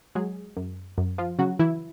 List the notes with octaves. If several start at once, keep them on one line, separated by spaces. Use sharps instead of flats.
F#3 G#3 G#4
F#2
F#2
F3 F4
C#3 F#3 F#4
E3 E4